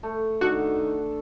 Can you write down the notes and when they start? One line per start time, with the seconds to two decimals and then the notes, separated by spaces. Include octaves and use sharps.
0.03 A3
0.41 D#3 D4 F#4 A4